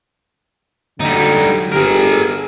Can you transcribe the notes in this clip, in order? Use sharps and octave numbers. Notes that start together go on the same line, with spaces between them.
D3 F#3 G3 D#4
G1 G4 G#4 A#4